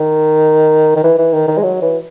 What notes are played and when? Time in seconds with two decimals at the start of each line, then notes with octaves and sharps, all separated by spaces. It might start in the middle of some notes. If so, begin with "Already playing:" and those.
Already playing: D#3
0.96 D#3
1.04 E3
1.18 E3
1.33 D#3
1.48 D#3
1.58 G#3
1.63 F#3
1.82 E3